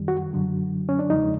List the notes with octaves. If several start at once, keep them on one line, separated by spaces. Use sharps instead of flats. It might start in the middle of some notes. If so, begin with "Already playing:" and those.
Already playing: F#2 D#3 G3
F#4
F#2 D3 F#3
C#4
D4
E2 C#3 F3 G#3 D#4